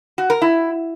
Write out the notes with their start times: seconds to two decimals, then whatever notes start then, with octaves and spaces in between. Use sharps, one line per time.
0.18 F#4
0.30 A#4
0.42 E4